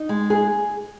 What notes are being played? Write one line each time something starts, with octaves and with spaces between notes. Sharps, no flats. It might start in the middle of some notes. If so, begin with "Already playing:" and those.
Already playing: D#4
G#3
G#4